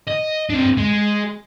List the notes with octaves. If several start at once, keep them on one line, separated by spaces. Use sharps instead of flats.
D#5
C4 D4
G#3